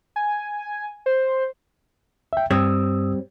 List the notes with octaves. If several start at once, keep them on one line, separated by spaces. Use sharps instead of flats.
G#5
C5
E5 G5
G2 G3 C4 C#5 D#6 E6